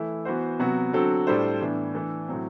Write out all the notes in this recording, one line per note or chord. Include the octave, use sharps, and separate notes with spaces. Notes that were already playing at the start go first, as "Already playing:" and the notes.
Already playing: E3 A3 E4
E3 B3 F#4 C5
C3 F#3 B3 F#4
D3 F#3 C4 F#4 A4
A2 G3 D4 A4 C5
A2 E3 B3 D4
E3 A3 D4 A4
A2 F#3 C4